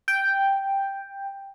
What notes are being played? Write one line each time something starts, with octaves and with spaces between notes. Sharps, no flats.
G5